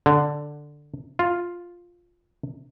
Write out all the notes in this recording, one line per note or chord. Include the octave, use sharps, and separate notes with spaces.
D3
F4